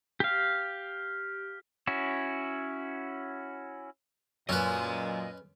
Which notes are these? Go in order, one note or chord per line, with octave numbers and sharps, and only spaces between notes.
G4 F5
C#4 E4 F#4
F#2 A#2 C#4 B4 D#5 G#5